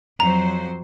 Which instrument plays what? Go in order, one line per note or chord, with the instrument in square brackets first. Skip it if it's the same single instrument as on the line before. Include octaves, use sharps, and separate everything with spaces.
[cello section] F2 F#3 C5 [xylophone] A#5